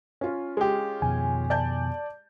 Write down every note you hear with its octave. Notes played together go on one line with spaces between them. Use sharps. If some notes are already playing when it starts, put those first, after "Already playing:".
C#4 F4
G#3 G4
F2 B2 D#3 G#5
D5 A5 G6